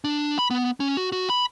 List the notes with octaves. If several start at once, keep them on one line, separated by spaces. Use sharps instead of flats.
D4
B5
B3
C#4
F#4
F#4
B5